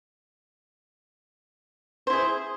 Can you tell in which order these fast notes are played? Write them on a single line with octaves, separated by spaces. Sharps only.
C5 E4 G#4